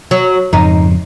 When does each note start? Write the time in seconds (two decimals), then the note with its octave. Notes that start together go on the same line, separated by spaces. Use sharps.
0.11 F#3
0.53 F2 G#2 C#3 D#4